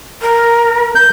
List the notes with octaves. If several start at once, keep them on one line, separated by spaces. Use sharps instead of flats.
A#4
G6